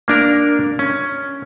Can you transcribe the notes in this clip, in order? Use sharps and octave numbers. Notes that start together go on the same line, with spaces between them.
A#3 D4 A#4
C#4